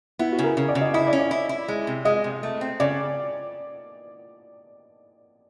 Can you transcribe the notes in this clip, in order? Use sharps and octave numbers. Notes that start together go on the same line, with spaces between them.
B3 E4
F#4
C#3
A#4
C#3
D5
C#3
D#5
E4 D#5
D5
C#4
D5
E4
E4
G#3
C3
G#3 D#5
C3
A3
C4
C#3 D5